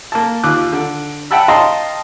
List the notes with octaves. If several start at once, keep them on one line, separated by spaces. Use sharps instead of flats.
A#3 A5
D#2 F4 D6 F#6
D3
E5 F#5 G5 A5 B5 E6
D#5 F5 G5 A5 A#5 C6